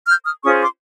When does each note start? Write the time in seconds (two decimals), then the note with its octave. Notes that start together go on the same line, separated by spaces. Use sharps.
0.08 F6 G6
0.25 D#6 F6
0.43 C#4 F4 G#4 C5 C#6 D#6
0.62 C6 D6